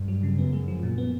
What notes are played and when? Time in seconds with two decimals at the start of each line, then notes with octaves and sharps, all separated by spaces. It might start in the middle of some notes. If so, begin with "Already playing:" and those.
Already playing: G2
0.08 F#3
0.23 C#3
0.38 F#2 B3
0.52 G#3
0.68 F3
0.83 A#2
0.98 B3